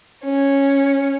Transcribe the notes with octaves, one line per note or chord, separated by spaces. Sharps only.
C#4